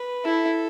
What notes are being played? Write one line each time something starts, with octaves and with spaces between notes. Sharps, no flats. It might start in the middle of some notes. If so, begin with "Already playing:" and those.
Already playing: B4
E4 A4